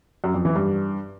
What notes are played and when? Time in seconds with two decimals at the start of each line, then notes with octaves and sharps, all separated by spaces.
0.24 F#2
0.34 F2
0.45 E3
0.55 G2